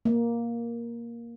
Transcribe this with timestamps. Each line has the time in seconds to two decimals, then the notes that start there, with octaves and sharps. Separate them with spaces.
0.05 A#3